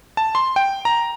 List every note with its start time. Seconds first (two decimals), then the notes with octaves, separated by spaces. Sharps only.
0.17 A5
0.35 C6
0.56 G5
0.85 A#5